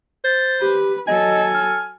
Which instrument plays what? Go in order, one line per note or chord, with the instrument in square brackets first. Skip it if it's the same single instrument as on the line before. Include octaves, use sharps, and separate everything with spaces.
[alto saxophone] C5 [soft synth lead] A6
[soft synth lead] G4 [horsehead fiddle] B4
[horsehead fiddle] F#3 A4 [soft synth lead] D#5 [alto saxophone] G#5
[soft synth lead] F6